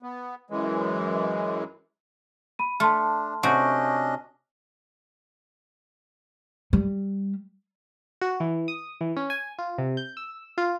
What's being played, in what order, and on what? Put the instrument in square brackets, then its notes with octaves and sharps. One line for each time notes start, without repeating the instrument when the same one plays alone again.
[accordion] B3
F#2 E3 G#3
[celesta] B5 D#7
[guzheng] A3 [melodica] D4 [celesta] A5 C6 F6
[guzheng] C3 A3 F#4 [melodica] C#4 D4 D#5 [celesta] G6 D7
[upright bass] G3
[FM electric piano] F#4
E3
D#6
E3
C#4
G#5
F4
C3
G6
E6
F4